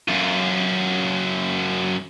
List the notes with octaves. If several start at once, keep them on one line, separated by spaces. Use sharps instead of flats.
F#2 F4